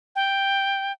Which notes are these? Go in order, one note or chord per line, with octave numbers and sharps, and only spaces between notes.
G5